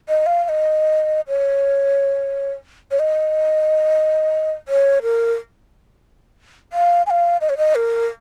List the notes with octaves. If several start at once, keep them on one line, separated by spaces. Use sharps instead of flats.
D#5
F5
F5
D#5
C#5
C#5
D#5
C#5
A#4
F5
G#5
F5
D#5
C#5
D#5
A#4